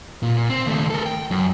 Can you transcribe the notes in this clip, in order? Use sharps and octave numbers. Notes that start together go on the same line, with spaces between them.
A#2
C4
D#2 A3
A4 A#4
G5
F#2